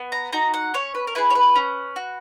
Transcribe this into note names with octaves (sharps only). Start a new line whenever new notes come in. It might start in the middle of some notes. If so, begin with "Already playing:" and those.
Already playing: B3
A#5
D#4 F#4 A#5
F#5
C#4 C#5
B4
A#4
E4 G#4 B4
C#5
B4
C#4
F#4